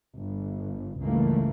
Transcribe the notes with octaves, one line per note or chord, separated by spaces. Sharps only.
G1
C#2 G2 E3 A3 A#3